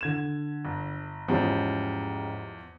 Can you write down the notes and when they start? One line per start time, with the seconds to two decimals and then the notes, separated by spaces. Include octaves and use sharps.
0.01 D3 G#6 E7
0.65 G1
1.28 E2 G#2 F3 G3 C#4